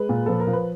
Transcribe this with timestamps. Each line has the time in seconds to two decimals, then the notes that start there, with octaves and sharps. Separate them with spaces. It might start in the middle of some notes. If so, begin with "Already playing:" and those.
Already playing: G#3 B4
0.09 A#2
0.26 F3 A4
0.40 A#4
0.47 F3
0.53 B4